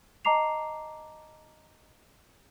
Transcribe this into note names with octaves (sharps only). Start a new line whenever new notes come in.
D#5 A5 A#5 D6 C7 F7